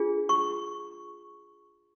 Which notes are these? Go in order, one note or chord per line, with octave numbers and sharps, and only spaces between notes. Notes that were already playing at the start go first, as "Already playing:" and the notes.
Already playing: D4 F4 G#4
C#6